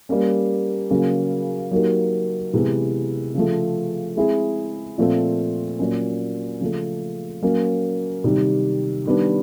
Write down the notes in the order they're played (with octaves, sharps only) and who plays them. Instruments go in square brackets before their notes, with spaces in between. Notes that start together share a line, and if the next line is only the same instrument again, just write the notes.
[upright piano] G3 A#3 C#4
C#3 F#3 A#3 C#4
F#3 A#3 D#4 G4 A#4
C3 E3 G#3 B3
C#3 F3 A3
G#3 C4 E4 G#4
A#2 F3 A3 C4 F4
A#2 F#3 A#3 C#4
C#3 F3 A3
F#3 A#3 C#4
C3 D#3 G3
D#3 G3 B3 D4